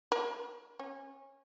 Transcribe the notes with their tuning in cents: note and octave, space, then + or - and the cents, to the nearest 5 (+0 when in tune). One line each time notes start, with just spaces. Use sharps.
A#4 +45
C#4 -20